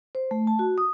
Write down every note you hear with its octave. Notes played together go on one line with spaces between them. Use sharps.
C5
A3
A5
F#4
D#6